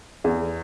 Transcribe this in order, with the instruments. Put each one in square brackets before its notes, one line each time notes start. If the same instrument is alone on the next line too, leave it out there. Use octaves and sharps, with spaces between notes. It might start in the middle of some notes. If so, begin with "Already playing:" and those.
[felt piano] E2